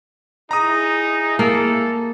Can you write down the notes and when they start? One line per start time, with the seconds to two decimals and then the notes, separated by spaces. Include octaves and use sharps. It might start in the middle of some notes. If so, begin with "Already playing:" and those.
0.51 D#4 E4 G#4 A#5 D#6
1.39 A#3 A4